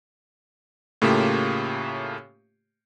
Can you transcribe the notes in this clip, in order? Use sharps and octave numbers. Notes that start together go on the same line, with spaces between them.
A2 C#3 A3 A#3 F4 G4